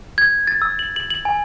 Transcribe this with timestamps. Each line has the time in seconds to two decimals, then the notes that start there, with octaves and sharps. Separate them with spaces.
0.18 G#6
0.47 A6
0.62 E6
0.79 F#7
0.96 F#7
1.10 F#7
1.25 G#5